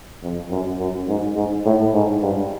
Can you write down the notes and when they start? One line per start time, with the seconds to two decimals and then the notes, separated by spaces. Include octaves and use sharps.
0.22 F2
0.50 F#2
0.79 F#2
1.08 G#2
1.36 G#2
1.65 A2
1.93 G#2
2.22 G2